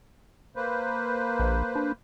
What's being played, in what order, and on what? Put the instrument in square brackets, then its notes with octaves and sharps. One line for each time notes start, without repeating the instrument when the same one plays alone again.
[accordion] A#3 B4 C5
[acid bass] A#1
D4